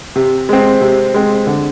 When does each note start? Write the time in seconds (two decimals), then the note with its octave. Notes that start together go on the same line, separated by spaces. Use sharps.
0.16 C3
0.49 G#3 C4
0.81 C3
1.14 G#3 C4
1.47 D3